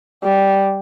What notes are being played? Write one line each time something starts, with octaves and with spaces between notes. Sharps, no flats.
G3